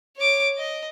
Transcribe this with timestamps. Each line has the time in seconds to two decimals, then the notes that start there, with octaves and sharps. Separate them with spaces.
0.16 C#5 D6
0.58 D#5